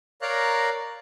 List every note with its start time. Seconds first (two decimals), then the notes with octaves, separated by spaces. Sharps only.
0.22 A#4 C#5 D5 F5 A#5 F#6